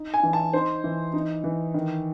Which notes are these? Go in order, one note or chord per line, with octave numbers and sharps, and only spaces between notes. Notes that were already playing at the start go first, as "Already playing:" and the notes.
Already playing: D#4
G#5
E3
A5
D#4 C5
E3
D#4
E3
D#3